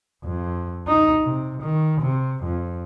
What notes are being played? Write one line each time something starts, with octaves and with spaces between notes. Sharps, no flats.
F2
D#4
C3
D#3
C3
F2